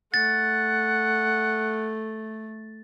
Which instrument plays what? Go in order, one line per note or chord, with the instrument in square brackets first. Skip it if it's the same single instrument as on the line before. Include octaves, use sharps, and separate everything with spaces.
[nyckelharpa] A3 [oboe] F#5 [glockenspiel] A6